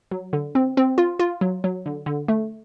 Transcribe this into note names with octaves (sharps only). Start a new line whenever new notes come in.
F#3
D3
C4
C4
F4
F4
F#3
F#3
D3
D3
A3